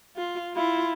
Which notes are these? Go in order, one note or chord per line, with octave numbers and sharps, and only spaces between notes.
F4
E4 F4